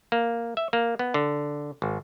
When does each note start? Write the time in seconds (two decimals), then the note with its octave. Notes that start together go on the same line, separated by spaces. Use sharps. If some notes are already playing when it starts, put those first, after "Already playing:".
0.12 A#3
0.57 E5
0.73 A#3
0.99 B3
1.14 D3
1.82 G#1